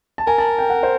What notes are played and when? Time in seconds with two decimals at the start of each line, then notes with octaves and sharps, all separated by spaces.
0.18 A5
0.27 A#4 G#5
0.38 A5
0.59 G5
0.70 F#5
0.83 C5